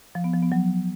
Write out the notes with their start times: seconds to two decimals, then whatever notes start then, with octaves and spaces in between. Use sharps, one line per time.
0.15 F3
0.24 B3
0.33 F3
0.43 B3
0.52 F#3